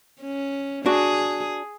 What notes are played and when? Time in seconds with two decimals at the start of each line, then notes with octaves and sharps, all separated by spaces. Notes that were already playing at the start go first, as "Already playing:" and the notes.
0.21 C#4
0.86 D4 F#4 G#4